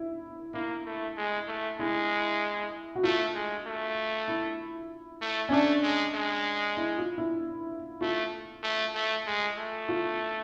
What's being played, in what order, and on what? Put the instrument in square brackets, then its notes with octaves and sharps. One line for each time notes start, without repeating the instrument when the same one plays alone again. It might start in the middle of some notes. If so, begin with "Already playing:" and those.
Already playing: [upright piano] E4
[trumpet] A#3 [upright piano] E4
[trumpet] A3
G#3
A3
[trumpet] G#3 [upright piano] E4
[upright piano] F#4
[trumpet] A3 [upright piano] F4
[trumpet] G#3
A3
[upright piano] E4
[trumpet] A3
[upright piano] C#4
[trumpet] A3 [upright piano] D4
[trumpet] G#3
G#3
[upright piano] E4
F4
E4
[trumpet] A3 [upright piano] F4
[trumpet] A3
A3
G#3
A3
[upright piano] F4